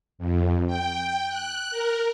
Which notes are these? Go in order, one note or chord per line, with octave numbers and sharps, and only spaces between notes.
F2
G5
F#6
A#4